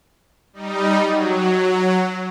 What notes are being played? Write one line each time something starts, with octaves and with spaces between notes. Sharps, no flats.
G3 D#4
F#3